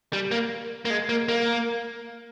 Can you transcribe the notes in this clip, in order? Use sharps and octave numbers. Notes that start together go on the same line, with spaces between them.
G3
A#3
A#3
G#3
A#3
A#3